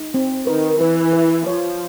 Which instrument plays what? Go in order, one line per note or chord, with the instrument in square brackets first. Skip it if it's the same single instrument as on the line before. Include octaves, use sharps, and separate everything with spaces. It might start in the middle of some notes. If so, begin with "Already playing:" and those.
Already playing: [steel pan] D#4
C4
[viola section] D#3 [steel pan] B4
[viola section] E3 [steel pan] B4
[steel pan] B4
[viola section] F3 [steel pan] C#5